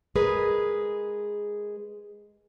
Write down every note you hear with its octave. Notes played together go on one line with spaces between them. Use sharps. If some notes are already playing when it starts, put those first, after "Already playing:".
G#3 G#4 A#4 B4